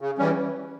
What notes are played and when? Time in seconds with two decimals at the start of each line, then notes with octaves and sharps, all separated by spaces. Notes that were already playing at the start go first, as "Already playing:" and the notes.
0.01 C#3
0.18 E3 G3 C#4